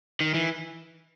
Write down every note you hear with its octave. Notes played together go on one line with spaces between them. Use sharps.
D#3
E3